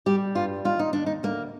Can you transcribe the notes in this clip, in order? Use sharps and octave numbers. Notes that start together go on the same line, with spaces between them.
G3 G4
G2 F4
D#2 F4
D#4
D#2 D4
D#4
D2 A#3